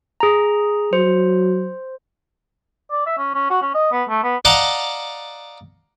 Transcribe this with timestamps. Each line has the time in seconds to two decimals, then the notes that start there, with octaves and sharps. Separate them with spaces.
0.20 G#4 A#5
0.93 F#3 C5
2.91 D5
3.06 E5
3.18 C#4
3.34 C#4
3.50 F#4
3.62 C#4
3.75 D#5
3.92 B3
4.09 A3
4.23 B3
4.45 D5 D#5 F5 F#5 A5 A#5